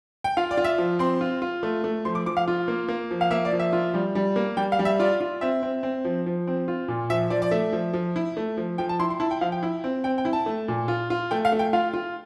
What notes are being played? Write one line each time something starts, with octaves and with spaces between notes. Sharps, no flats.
G5
F4 F5
D5
F4
E5
F3
C4 C6
F4
F4
A3
A3
F3 C6
D6
F3 D6
F5
F4
A#3
A#3
F3
F5
A#3 E5
D5
F3
E5
F4
G3
G3
A#3
G3 G5
F5
G3
E5
F4 D5
F4
C4 E5
C4
C4
F3
F3
C4
F4
A#2
F3 E5
F3 D5
D5
A3 E5
F3
F3
E4
A3
F3
F3 G5
A5
E4 C6
C6
E4 A5
G5
F3 F5
G5
E4
C4
C4 G5
G5
E4
A5
A3
A#2
F4
F4
A3 G5
F5
A3
G5
F4 F5
F4